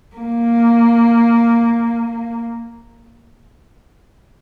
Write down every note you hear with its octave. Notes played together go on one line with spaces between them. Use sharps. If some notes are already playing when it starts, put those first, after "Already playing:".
A#3